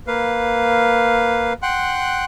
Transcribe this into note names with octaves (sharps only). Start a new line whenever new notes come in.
A#3 B4 F5
F#5 G5 C6 F#6